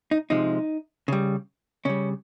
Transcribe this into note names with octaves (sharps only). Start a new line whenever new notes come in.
D#4
C3 F3 G#3 D#4
C#3 G3
C#3 G3 C#4